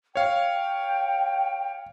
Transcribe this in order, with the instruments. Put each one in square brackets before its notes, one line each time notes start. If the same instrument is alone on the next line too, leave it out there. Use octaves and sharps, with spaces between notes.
[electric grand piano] C#5 F5 [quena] G5